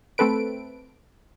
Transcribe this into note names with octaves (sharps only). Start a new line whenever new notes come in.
A3 C4 A4 B4 D7